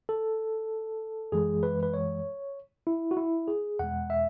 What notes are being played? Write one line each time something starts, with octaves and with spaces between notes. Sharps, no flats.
A4
F#2 E3 G#3 G#4
B4
B4
C#5
E4
F#4
E4
G#4
E2 B2 G#3 F#5
E5